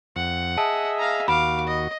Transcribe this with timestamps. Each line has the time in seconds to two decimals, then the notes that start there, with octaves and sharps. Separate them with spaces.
0.16 F2 F#5
0.58 G#4 D#5 E5 A5
0.98 F5 A#5
1.28 D#2 F#4 F5 B5 D6
1.67 D#5